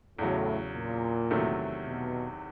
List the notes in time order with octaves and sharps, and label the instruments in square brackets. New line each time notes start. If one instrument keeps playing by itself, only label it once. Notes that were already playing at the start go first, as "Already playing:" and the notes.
[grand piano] E2 C#3 F#3 [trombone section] A2
[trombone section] A#2
[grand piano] E2 C3 D#3 F#3 A3
[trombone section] B2